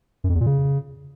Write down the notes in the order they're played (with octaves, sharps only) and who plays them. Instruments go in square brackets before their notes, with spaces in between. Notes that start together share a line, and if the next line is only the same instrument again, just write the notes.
[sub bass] F#2
F2
E2
A#2
C#3